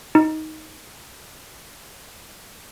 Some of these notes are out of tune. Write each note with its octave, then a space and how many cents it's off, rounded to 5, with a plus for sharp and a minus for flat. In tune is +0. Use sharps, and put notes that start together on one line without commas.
D#4 +10